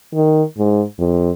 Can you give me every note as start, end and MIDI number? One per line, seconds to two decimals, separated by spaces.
0.14 0.43 51
0.58 0.83 44
0.99 1.31 41